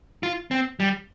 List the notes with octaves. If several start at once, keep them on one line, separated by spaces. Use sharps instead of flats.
F4
C4
G3